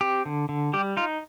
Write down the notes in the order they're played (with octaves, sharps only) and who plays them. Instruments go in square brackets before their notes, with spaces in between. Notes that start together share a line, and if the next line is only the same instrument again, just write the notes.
[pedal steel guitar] C4 G4
D3
D3
G3 G4
D#4 F4